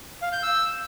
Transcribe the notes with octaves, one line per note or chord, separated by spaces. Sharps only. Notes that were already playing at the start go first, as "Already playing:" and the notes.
F5
G6
E6